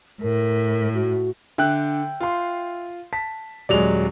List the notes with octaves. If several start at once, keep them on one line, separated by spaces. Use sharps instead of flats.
A2 A#4
F#4
D3 E5 G5 F#6
F4 C6
A5 B6
D#1 F#3 G#3 D5 F7